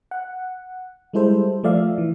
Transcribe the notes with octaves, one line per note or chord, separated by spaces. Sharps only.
F#5
G3 G#3 E4 A4 C5
F3 A3 D5 E5 F5
E3